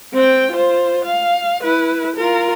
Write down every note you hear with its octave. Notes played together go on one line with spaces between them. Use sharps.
C4 G5
F4 C5
F5
E4 B4
F4 A#4